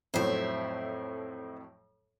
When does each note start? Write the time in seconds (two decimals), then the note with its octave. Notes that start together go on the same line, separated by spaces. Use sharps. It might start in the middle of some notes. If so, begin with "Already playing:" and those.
0.14 F2 A2 F#3 C5 E5